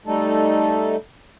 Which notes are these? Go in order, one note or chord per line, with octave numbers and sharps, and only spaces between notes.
G3 A3 D#4 A4